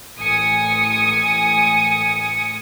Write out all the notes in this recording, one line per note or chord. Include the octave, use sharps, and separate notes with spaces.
A1 G#5 D#6 C#7